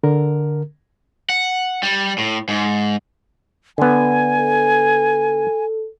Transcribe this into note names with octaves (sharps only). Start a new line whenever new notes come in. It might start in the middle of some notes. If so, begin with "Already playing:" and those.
D3 A#4
F#5
G3
A2
G#2
D3 B3 G#5
A4